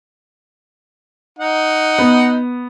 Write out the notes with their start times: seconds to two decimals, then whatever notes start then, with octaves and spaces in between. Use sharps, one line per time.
1.39 D#4 F#5
1.99 B3